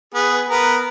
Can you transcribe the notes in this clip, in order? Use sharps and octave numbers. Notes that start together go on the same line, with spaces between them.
B3 G#4
B3 A#4